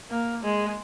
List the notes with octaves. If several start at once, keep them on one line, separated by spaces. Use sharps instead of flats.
A#3
G#3